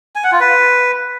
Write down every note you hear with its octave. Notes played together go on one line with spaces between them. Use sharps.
G#5
F#5
F4
B4